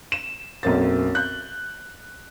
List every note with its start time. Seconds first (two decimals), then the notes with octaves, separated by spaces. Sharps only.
0.12 E7
0.63 B1 F#2 A#3 C4 A6
1.15 F#6 G6